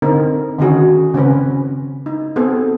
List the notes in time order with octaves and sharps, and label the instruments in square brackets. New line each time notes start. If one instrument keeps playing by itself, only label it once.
[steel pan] D3 C4 D#4 A#4
D3 D#3 C#4 F#4 G#4
C#3 C4 C#4 B4
D#4
B3 C4 G#4 A4 C5